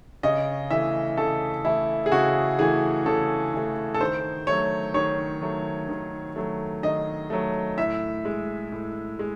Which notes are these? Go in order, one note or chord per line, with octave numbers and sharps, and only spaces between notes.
C#3 D#5
E3 A3 E5
C#3 A4
E3 A3 E4
G#4
C#3 F#4
E3 A3 G#4
C#3 A4
E3 A3
A4
D#3 C5
F#3 A3 C#5
D#3 C#5
F#3 A3
D#3
F#3 A3
D#3 D#5
F#3 A3
A2 E5
G#3
A2
G#3